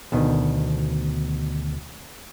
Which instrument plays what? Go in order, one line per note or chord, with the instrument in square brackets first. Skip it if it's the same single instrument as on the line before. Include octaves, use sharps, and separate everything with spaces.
[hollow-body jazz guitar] D2 B2 D#3